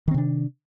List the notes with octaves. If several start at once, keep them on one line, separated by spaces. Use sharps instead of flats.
C3 D#3 C4 D4